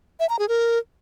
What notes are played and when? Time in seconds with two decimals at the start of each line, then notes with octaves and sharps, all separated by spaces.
0.20 E5
0.29 A#5
0.39 G#4
0.49 A#4